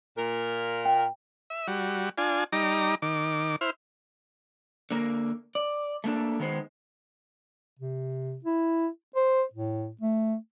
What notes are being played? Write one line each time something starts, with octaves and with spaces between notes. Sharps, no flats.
A#2 A#4
G5
E5
G3 F#4
D4 F4 G#5
G3 D#4 A#5 D6
D#3 D6
E4 C5 F6
D3 A#3 A#4
D5
A3 A#3 D4 A4
D#3 G#3 B3 C5
C3
E4
C5
A2
A3